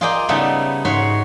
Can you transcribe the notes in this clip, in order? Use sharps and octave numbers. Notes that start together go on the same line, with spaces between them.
F4 G#4 A#4 D5 D#5 G5
C#3 G3 B3 D#4 E4 A4
G#2 F#4 C#5 B5 C6